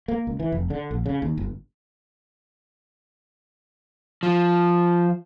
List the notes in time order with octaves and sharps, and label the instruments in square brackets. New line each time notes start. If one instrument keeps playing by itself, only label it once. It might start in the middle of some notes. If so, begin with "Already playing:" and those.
[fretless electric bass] A#3
C#2
E3
F1
D3
A#1
C#3
D#2
G1
[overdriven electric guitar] F3